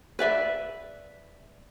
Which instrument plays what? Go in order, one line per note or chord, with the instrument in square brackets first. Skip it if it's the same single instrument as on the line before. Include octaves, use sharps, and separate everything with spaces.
[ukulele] B4 D5 E5